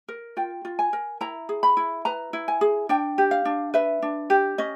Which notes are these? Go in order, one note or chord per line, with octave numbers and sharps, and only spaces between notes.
A#4
F4 G5
F4
G#5
A#4
E4 A#5
G#4
B5
E4
B4 A#5
E4
G#5
G#4
D4 G5
G4
F5
D4
B4 E5
D4
G4
C#4 D#5